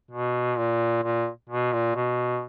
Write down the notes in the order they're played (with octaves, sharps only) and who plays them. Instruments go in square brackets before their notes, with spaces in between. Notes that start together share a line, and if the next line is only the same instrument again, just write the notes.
[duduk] B2
A#2
A#2
B2
A#2
B2